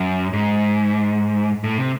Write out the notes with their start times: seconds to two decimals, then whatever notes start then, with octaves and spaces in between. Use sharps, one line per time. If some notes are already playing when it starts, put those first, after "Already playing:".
Already playing: F#2
0.33 G#2
1.64 A2
1.78 C3